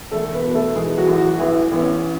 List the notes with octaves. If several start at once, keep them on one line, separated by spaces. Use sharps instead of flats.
E1 A3 A4
B3 B4
B2
A3 A4
E3 G#3 G#4
F#3 F#4
A1
F#3 F#4
A1 E3 E4
A1 B3
C#4